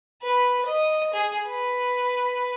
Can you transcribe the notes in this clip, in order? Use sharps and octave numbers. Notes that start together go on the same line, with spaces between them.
B4
D#5
G#4
B4